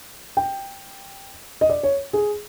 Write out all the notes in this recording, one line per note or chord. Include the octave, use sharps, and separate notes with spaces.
G5
D#5
D5
C#5
G#4